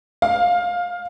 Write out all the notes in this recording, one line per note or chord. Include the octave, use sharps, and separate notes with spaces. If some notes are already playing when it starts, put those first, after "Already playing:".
F5